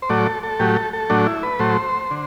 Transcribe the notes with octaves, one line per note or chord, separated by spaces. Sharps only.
C5
A2 F#3 A3 D5
A4
A4
A2 F#3 A3 G4
A4
A4
A2 F#3 A3 D4
E4
B4
A2 F#3 A3 C5
D3